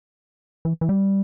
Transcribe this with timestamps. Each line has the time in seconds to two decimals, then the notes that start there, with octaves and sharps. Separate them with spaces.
0.65 E3
0.81 E3
0.89 G3